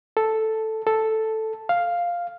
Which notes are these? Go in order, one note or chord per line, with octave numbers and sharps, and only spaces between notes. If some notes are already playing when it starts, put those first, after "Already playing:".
A4
A4
F5